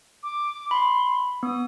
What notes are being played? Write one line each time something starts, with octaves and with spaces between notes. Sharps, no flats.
D6
B5 C6
B3 D#6